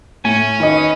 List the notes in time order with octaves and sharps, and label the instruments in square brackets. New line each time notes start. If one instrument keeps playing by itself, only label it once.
[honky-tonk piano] A2 [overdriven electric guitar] C#4 [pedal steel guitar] G#5
[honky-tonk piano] D#3 D#5 [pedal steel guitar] B4